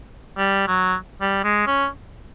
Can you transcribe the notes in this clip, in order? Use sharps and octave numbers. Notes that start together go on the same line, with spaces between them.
G3
F#3
G3
G#3
C#4